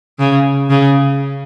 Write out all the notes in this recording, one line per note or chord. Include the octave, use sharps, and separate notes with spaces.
C#3
C#3